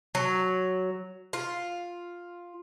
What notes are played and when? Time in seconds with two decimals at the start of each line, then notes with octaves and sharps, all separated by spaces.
0.15 F#3
1.33 F4